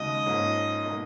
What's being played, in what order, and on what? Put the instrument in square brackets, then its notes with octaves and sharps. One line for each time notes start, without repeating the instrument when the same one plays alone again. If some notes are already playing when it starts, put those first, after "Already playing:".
Already playing: [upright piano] D#2 C#3 G#3 D#4 F#4 [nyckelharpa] D#5
[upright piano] G#2 F3 A#3 C#4
B2 A#3 D#4